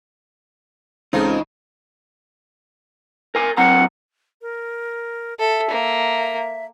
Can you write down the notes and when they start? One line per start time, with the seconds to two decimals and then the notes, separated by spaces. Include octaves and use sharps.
1.13 C#2 C#3 E3 G#3 C4 D#4 F4 A4
3.35 A#4 G#5
3.57 F#3 C4 F#5 A#5
4.42 A#4
5.40 A4 E5
5.71 A#3